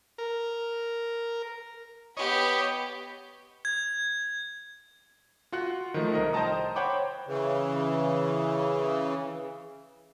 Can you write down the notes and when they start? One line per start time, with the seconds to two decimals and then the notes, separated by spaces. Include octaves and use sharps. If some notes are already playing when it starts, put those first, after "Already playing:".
0.18 A#4
2.17 B3 G4 C#5 D#5 B5
3.65 G#6
5.52 F4 F#4 F#5 F#6
5.94 D#3 F3 A3
6.14 C2 A#4 D#5
6.33 C5 D#5 G5 A5 A#5 D#6
6.76 C5 C#5 F#5 G5 B5 D6
7.27 C#3 E3